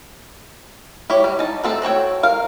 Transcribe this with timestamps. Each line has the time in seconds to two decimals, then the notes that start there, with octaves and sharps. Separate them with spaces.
1.10 E4 G4 C#5
1.24 G3
1.39 D#4 A5
1.64 A3 C4 A4
1.82 F#4 A4 C#5 G5
2.23 A#4 F5